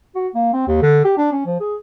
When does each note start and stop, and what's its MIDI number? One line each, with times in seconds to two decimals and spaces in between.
0.15 0.27 66
0.35 0.51 58
0.53 0.66 60
0.67 0.78 39
0.82 1.04 50
1.04 1.15 67
1.17 1.30 62
1.32 1.42 61
1.46 1.57 53
1.60 1.75 68